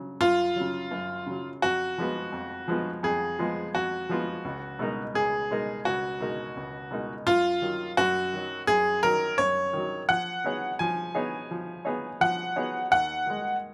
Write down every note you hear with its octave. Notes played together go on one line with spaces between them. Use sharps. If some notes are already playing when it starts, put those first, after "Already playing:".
Already playing: C#3 F#3
F#2 F4
C#3 F#3
F#2
C#3 F#3
F2 F#4
F3 G#3 B3 F4
F2
F3 G#3 B3 F4
F2 G#4
F3 G#3 B3 F4
F2 F#4
F3 G#3 B3 F4
C#2
B2 G#3 D#4 A#4
C#2 G#4
B2 G#3 D#4 A#4
C#2 F#4
B2 G#3 D#4 A#4
C#2
B2 G#3 D#4 A#4
F#2 F4
D#3 F#3
F#2 F#4
D#3 F#3
F#2 G#4
D#3 F#3 A#4
F#2 C#5
D#3 F#3
F3 F#5
B3 D#4 G#4 C#5
F3 G#5
B3 D#4 G#4 C#5
F3
B3 D#4 G#4 C#5
F3 F#5
B3 D#4 G#4 C#5
D#2 F#5
D#3 G#3